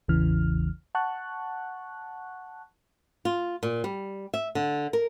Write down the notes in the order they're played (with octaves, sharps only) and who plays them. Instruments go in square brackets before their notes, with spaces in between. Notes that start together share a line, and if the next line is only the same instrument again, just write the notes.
[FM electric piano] A1 E2 C#3 E3 F6
F#5 A5 C#6 F#6
[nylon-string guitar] F4
A#2
G3
E5
D3
A#4